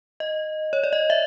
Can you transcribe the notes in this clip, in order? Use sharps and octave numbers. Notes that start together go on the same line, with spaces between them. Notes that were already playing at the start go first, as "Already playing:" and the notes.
D#5
C#5
D5
D#5
E5